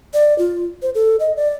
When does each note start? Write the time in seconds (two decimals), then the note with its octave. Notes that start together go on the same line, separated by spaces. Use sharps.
0.14 D5
0.38 F4
0.82 C5
0.95 A4
1.20 D#5
1.36 D5